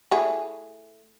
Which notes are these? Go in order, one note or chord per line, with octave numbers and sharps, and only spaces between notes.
A3 E4 G#4